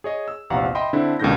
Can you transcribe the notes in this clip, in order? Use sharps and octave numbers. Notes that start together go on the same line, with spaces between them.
G#4 C#5 D#5
E6
A#1 E2 C3 F5 F#5 A#5
D#5 E5 G5 B5 C6
D3 C4 D4 E4
C#2 B2 D3 D#3 G6 A#6